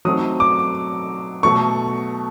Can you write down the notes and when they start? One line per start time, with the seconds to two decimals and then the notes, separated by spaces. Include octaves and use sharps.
0.05 F#3 A3 C4 D#4 D#6
0.40 D6
1.43 B2 F#3 A3 C#6